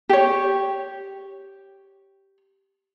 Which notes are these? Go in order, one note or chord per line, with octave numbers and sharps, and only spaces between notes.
G4 C#5